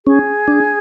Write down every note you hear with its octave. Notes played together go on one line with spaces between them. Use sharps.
C#4 G#4
D4